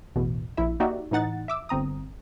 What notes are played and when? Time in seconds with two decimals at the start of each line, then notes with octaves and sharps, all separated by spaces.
0.16 A1 E2 B2
0.57 A#1 E4 E5
0.80 A#3 D#4 F#4 G4 D5 E5
1.11 A2 E3 D#4 F#5 A6
1.48 E5 D6 E6
1.69 G1 C4 A#5 D#6